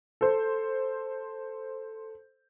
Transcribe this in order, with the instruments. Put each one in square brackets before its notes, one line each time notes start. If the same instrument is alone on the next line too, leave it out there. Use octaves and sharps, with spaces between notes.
[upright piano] A4 C5